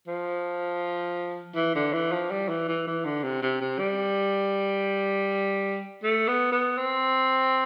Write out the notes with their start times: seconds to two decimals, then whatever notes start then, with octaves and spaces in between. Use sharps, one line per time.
0.07 F3
1.55 E3
1.75 D3
1.93 E3
2.12 F3
2.31 G3
2.48 E3
2.68 E3
2.87 E3
3.05 D3
3.23 C3
3.42 C3
3.61 C3
3.79 G3
6.03 A3
6.28 B3
6.52 B3
6.78 C4